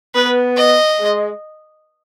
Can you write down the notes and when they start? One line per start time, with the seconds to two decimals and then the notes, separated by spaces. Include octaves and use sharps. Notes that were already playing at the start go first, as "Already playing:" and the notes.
0.15 B3 B4
0.57 D#5
0.99 G#3